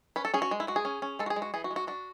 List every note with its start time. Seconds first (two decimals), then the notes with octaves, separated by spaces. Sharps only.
0.16 C#4 B4
0.25 A4
0.34 C#4 G#4
0.42 F#4
0.51 G#3
0.60 E4
0.67 G#3 F#4
0.76 G#4
0.85 C#4
1.02 C#4
1.19 G#3 A4
1.26 F#4
1.30 G#4
1.36 G#3
1.42 F#4
1.54 E3 G#4
1.64 F#4
1.71 G#3
1.76 F#4
1.87 D4 F#4